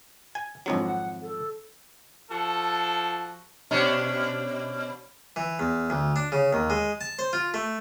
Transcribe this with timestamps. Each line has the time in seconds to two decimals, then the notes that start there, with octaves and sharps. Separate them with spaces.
0.35 G#5
0.66 G#1 F2 F#3 D4
0.83 F#5
1.22 A4
2.30 F3 F#4 A4
3.71 B2 C#4 D4
5.36 E3
5.59 E2
5.90 D2
6.16 D4
6.32 C#3
6.53 D#2
6.70 G#3
7.01 A5
7.19 C5
7.33 F4
7.54 A3